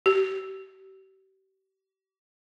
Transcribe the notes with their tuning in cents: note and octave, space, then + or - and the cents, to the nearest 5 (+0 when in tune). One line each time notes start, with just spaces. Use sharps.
G4 -40